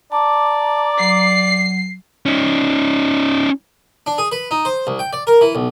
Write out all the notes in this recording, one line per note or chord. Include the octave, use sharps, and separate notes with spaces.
D5 A5 A#5 D6
F#3 C7
C#4 D#4
D4
G#4
B4
D#4
C5
C2
G5
D5
A#4
E3
B1